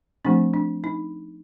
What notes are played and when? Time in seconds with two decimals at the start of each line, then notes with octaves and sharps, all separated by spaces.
0.25 F3 A3 C4 D4
0.54 D4
0.84 D#4